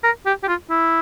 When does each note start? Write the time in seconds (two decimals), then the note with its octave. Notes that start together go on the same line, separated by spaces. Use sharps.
0.04 A#4
0.26 G4
0.43 G4
0.48 F4
0.70 E4